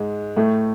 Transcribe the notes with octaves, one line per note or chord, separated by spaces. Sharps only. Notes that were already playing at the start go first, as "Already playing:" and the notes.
Already playing: G#2 G#3
A2 A3